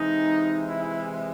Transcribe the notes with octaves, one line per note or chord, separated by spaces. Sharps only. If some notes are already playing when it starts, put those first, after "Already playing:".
Already playing: C3 E3 G#3 D#4
E4